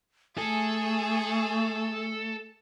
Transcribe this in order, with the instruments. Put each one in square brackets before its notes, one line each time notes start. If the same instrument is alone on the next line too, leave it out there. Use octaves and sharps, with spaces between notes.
[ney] A3 [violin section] G#4 [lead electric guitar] A4